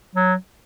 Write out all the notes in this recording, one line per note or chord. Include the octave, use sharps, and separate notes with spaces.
F#3